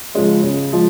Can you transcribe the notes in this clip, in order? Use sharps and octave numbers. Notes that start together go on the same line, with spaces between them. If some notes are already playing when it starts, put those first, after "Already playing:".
C#3 F3 G#3 C#4
C#3
F3 G#3